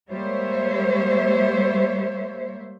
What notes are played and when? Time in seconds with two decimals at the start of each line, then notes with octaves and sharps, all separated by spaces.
0.11 G3 G#3 A#3 C5 C#5 E5